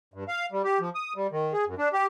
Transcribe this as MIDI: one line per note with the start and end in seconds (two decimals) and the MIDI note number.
0.14 0.24 43
0.28 0.46 77
0.52 0.62 55
0.64 0.79 67
0.80 0.90 53
0.95 1.13 87
1.16 1.27 55
1.32 1.53 51
1.53 1.65 68
1.67 1.75 42
1.78 1.89 62
1.93 2.06 67